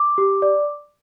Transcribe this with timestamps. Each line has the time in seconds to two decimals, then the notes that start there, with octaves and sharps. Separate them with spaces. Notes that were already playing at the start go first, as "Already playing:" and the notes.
Already playing: D6
0.18 G4
0.42 D5